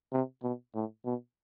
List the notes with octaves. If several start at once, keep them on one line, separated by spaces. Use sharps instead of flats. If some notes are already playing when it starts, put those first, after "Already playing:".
C3
B2
A2
B2